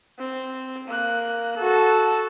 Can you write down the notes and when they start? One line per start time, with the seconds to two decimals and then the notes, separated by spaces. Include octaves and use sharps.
0.19 C4
0.88 A#3 F#6
1.57 F#4 A4